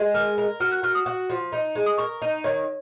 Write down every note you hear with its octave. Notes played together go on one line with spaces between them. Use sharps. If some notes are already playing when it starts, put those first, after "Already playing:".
Already playing: G#3
A#4 F6
A#4
F#4 F6
F#6
F#4 F6
D#6
F#4
F3
D#4
G#3
D#6
A#4 C#6
D#4
D#3 C#5